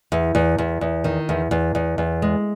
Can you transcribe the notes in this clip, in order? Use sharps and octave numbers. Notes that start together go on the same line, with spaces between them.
E2
E2
E2
E2
D#3
E2
E2
E2
E2
G#3